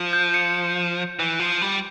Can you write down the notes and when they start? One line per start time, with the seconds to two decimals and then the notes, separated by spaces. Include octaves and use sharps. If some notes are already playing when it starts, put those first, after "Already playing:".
Already playing: F3
0.13 G6
0.34 C#7
1.19 E3
1.40 F3
1.62 G3